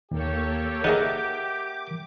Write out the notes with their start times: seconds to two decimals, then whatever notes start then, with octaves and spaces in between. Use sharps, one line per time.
0.11 D#2 A#3 G4 A4 C#5
0.84 D#4 G#4 A#4 D#5 E5 F#5 D6